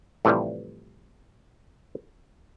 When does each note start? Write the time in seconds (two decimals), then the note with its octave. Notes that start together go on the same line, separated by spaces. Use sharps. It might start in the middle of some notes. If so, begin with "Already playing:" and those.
0.25 A2 C3 E3 F3 G3